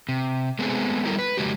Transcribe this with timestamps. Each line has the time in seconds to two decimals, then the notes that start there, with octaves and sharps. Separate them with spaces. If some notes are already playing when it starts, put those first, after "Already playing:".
0.09 C3
0.59 G#3 A3 B3 C4 G#4
1.05 F#3 G3 E4 A4 A#4
1.19 B4
1.37 F2 C#3 G#3 F#4 G4